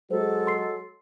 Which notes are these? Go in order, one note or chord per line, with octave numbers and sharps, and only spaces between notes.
F#3 G#3 F#4 A4 C5
C6 C7